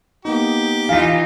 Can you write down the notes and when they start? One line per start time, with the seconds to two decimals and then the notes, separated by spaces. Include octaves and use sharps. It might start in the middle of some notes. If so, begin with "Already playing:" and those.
0.25 A#3 B3 D#4 G4
0.89 E3 D#4 F4 F5 G#5 B6